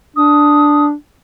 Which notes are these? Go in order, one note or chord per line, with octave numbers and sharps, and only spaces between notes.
D4 D#6